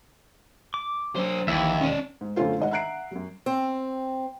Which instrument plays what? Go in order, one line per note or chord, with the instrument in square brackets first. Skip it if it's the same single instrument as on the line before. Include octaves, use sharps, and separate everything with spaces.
[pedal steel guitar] D6
[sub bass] F#3 [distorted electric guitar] D4 C5
[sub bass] A#1 [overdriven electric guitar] D#2 [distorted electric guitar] E3 [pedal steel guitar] E4 E5
[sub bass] E1 [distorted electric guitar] C#4 D5
[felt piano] G#2
F#2 D3 A3 C#4 F4 C5
G#2 D#3 D#5 F#5
E5 F#5 A#5 F#6 C7 D7
F#2 F#3
[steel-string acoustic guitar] C4